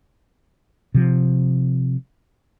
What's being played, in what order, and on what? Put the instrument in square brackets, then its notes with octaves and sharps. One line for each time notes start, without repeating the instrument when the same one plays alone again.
[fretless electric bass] C3 F3